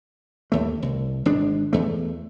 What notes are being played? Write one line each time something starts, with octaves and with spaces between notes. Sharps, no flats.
D#2 A3
C2
G#1 G#3 D4
E2 A3